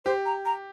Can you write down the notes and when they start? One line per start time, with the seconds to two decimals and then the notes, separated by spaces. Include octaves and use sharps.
0.05 G4 C5
0.26 A#5
0.45 A#5